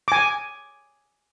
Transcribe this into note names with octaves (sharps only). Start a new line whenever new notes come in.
G#5 D6